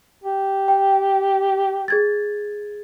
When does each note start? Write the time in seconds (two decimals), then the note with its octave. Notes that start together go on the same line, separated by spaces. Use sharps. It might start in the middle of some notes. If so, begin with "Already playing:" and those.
0.24 G4
0.68 G5
1.88 G#4 G#6 A6